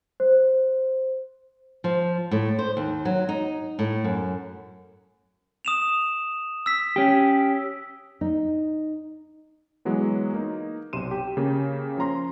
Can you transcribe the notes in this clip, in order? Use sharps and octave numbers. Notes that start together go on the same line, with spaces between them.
C5
F3
A2
C5
D#2
F#3
D#4
A2
F#2
D#6 E7 F7
E6 B6
C#4 G4
D#4
E3 F#3 G#3 B3
A#3 D#4
B1 C3 C6 D#7 E7
G4
C#3 A#3 G4
F3 A#3 C#4 A#5 C6 A#6